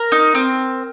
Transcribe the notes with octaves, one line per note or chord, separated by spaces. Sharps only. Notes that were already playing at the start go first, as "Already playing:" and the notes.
Already playing: A#4
D#4
C4